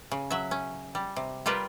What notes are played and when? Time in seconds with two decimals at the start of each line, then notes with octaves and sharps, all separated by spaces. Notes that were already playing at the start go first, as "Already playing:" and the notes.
0.11 C#3
0.30 F#3 E5
0.51 C#4
0.95 G3
1.16 C3
1.46 G3 F4 G4 A#4 B4